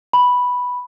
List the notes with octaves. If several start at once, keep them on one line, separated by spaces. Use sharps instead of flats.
B5